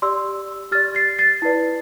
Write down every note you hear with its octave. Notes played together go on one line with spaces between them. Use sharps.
G4 D5 C6 E6
G4 D5 F6 A6
A6 C7
A6 C7
E4 B4 D5